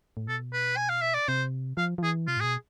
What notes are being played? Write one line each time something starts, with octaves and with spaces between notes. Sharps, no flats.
A2
B2 A4
B4
G#5
F5
E5
D5
C3 C5
F3 F5
F3
E3 G#4
C3 F4
A2
B2 G#4